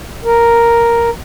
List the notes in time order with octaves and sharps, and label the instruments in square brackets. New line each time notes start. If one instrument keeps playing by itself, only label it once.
[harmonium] A#4